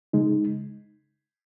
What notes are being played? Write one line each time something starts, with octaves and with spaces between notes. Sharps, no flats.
C#3 G#3 D#4